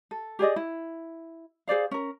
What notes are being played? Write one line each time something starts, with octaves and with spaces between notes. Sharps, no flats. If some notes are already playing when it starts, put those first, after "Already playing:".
A4
G4 G#4 D5 D#5
E4
G#4 C5 D5 F5
C#4 A#4